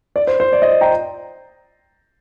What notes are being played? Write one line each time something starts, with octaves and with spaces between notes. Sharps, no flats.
D5
C5
C5
D5
C5 D#5
G5 A#5